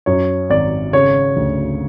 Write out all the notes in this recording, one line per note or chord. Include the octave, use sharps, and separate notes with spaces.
F#2 C#5
G#1 D5
C#3 C#5
D2